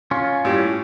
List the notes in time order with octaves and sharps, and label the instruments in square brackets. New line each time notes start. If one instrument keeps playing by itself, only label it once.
[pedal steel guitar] C#4 F4 C#5
[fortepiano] A2 G3